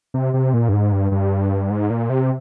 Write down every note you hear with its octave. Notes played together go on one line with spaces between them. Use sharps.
C3
C3
A#2
G2
G#2
G2
G2
G#2
A#2
C3